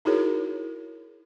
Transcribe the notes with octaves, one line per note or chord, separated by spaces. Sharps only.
D#4 E4 F#4 G#4 A#4 C#5